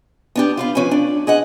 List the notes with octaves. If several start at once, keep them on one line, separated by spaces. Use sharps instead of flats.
B3 D4 G4
F4 B4 F5
F3 C#4 B4 G#5
D4
G#4 D#5 F#5